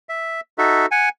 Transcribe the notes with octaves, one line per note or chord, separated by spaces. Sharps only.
E5
D#4 F#4 A4 E5
F#5 G#5